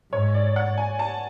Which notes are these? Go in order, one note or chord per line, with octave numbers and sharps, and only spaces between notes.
G#2 C#5
D5
F#5
G#5
A5